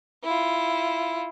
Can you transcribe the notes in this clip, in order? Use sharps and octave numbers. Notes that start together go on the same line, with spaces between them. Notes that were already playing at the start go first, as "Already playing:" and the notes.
E4 F4